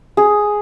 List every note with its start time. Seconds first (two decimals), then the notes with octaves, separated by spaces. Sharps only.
0.17 G#4